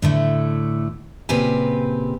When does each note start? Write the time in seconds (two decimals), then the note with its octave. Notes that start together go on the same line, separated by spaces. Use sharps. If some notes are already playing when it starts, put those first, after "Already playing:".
0.02 A2 D3 A3
1.29 A#2 C#3 C4 G4 B4 G#5